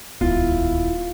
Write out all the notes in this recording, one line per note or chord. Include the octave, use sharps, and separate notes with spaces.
D#1 C#2 B3 E4 F4